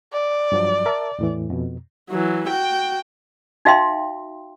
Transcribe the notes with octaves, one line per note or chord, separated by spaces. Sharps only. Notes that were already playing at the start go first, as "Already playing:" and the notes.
D5
G2 F3 F#3
A#4 E5 A5
E2 A2 E3
F2 B2
E3 F#3
F#4 G5
D#4 F#4 E5 F5 G5 C6